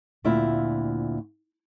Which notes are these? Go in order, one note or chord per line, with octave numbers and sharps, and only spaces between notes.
D2 A#2 C4 E4 F4 E5